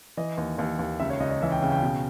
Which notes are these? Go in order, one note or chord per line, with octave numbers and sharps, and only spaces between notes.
E3 D#5
D#2
D#2 D#5
D#2
C#2 E5
C#5
C#2 D#5
D#5
E3 E5
G5
C#3 G5
G5
B2